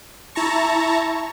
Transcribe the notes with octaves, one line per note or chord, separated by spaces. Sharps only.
E4 A5 A#5 C#6